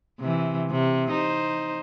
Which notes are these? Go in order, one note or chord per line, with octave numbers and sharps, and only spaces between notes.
C3 E3
C3
D#4 C5